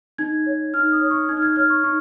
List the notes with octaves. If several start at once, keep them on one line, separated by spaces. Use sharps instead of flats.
D#4 G#6
C#5
D#4 F6
D#6
C#5
C#6
D#4 G#6
F6
G#6
C#5 F6
C#6
D#4 C#6